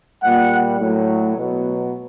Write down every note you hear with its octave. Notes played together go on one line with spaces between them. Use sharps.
A#2 G3 F#5
A2 F#3
B2 F#3